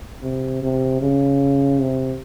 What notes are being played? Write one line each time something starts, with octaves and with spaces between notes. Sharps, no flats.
C3
C3
C#3
C3